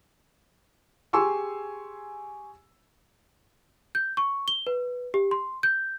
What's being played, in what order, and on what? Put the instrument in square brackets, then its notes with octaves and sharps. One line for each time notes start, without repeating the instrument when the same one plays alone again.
[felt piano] G4 G#4 G#5 C6 C#6 E6
[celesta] G6
C#6
G7
B4
G4
C6
G6